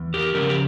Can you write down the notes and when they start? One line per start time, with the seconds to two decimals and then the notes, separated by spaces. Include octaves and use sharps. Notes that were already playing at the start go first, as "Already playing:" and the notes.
Already playing: E2
0.14 G4 A#4
0.34 C#3 F3 C#4 G4 A#4
0.49 G4